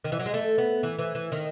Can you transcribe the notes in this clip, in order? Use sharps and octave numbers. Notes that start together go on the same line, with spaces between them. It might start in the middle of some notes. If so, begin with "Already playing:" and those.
D#3
E3
F#3
G#3
A3
B3
E3
E3
E3
D#3